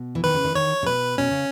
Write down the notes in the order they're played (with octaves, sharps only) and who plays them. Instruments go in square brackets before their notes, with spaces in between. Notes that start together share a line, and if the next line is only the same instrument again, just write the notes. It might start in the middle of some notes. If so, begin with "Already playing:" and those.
Already playing: [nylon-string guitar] B2
E3
[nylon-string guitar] D#3 [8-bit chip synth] B4
[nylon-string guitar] C#3
D#3
[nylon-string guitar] D#3 [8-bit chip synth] C#5
[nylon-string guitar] C#3
[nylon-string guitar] B2 [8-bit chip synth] B4
[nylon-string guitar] B2 [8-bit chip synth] C#4
[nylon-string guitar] C#3